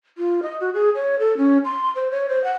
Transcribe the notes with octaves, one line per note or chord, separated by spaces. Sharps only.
F4
D#5
F#4
G#4
C#5
A4
C#4
C6
C5
C#5
C5
F#5